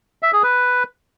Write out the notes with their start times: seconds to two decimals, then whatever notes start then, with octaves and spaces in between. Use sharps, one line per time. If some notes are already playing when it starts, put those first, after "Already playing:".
0.23 E5
0.33 G#4
0.43 B4